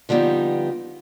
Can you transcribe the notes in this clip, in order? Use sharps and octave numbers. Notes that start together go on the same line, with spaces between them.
D3 F3 G3 B3 D#4